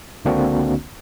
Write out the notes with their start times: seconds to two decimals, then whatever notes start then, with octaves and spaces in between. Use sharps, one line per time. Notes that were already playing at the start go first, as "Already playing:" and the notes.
0.25 C#2 D3 A#3 C4 D4 F#4